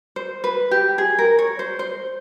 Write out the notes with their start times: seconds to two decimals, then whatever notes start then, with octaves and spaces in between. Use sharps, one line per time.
0.16 C5
0.44 B4
0.71 G4
0.98 G#4
1.19 A#4
1.39 C#5
1.59 C5
1.79 C5